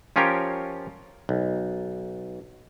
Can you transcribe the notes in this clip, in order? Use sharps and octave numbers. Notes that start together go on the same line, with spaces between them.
F3 C#4 F4 G4 A#4 C#5
B1